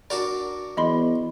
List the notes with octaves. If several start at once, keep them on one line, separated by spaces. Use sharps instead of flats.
D4 F#4 A#4 D5
E2 D#5 B5 C6